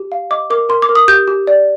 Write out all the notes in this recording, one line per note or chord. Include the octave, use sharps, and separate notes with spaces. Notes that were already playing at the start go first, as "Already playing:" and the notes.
Already playing: G4
F5
D#5 D6
A#4 D6
A#4 C6
D6
A#4
D#6
G4 G6
G4
D5